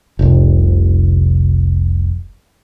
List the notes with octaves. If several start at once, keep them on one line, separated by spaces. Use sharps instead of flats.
F1 C2